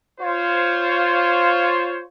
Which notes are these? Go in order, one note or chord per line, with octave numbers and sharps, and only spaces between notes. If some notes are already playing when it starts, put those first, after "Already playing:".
F4 C5 C#5